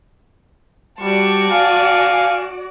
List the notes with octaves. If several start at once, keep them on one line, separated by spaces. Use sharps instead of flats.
G3 F#4 D5 A5 C#6
F5 G#5